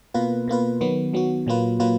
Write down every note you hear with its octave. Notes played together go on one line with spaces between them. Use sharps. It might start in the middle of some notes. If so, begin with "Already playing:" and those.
B2 A#3 F4 B4
B2 A#3 F4 B4
D#3 F#3 B3 F#4
D#3 F#3 B3 F#4
A#2 F#3 A#3 F4 B4
A#2 F#3 A#3 F4 B4